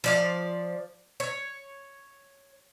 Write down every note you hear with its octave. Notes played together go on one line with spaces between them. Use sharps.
F3 D5 F5
C#5